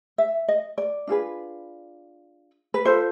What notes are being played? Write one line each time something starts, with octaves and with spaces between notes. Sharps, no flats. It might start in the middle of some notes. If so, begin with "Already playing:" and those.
E5
D#5
D5
D4 F4 G#4 B4
B4
F4 A4 C5